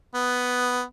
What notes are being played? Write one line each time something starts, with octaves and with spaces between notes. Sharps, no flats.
B3